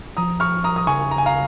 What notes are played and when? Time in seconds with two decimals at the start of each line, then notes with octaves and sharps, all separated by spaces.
0.17 F3 A#5 D#6
0.40 C#6 F6
0.64 A#5 D#6
0.76 D#6
0.87 C#3 G#5 C#6
1.11 A#5
1.18 G#5
1.26 F5 A#5